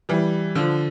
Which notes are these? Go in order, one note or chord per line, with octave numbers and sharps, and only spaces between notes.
E3 G3
D3 F3